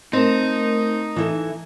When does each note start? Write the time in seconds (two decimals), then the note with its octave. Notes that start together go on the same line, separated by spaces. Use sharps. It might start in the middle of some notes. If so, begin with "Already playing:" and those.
0.13 A3 C4 D#4 A#4 A5
1.16 E3 E4 A4